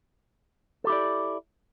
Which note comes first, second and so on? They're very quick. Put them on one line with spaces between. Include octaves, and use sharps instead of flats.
A4 G4 E4 D5